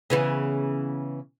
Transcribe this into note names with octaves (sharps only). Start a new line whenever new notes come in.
C#3 E3 B3